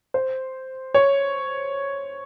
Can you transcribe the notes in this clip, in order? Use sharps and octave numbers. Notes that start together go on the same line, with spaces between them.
C5
C#5